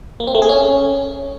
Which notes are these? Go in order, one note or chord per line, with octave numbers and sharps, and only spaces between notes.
A#3
C4
A3
G#4
C#4